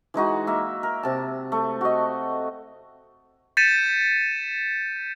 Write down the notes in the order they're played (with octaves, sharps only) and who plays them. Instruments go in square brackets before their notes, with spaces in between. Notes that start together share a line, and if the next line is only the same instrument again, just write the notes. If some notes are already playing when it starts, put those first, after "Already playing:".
[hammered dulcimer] E3 G#3 D#4 F#4
A#3 E5
A#4
C3 A5
A3
F#4 D#5
[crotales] G6 A6 B6 C#7 D#7 E7